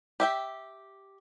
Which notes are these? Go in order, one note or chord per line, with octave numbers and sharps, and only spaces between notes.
G4 E5 G5